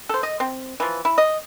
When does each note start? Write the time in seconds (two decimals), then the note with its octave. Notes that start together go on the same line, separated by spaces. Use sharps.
0.09 A4 C5
0.23 D#5
0.40 C4
0.80 E3 F3
1.05 E4
1.18 D#5